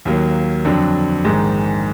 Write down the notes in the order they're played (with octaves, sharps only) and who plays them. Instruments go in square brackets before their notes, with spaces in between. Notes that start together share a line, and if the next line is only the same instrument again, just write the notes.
[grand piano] D#2 D#3 F#3 A#3
F2 D3 F#3 D4
A#1 G#2 D#3 G#3